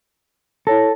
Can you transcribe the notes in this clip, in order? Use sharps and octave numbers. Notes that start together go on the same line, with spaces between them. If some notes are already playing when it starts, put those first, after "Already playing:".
E4 A4 C#5 A#6